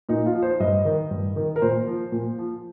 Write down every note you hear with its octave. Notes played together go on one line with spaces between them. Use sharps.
A#2 D#4
F4
F3
C5
G2 D#5
D#3
G2
D#3
A#4
A#2 C5
F3
A#2
F3